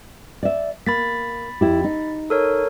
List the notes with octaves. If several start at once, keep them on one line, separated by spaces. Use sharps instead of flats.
D5 E5
A#3 B5 A6 B6
F2 E4 G4
D#4
A4 A#4 C#5